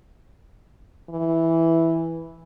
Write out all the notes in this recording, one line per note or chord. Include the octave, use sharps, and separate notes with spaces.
E3